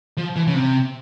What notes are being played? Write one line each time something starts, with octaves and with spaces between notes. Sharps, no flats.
F3
E3
C#3
C3